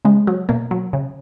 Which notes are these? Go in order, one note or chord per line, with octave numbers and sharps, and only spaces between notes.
C#3 G#3
F#3
B2 A#3
F#3
C#3